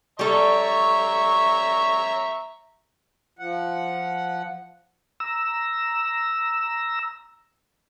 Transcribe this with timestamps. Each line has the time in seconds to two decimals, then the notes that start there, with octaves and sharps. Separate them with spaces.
0.19 G3 A4 C#5 E5 A#5 C#6
3.39 F3 F#5
5.20 A#5 E6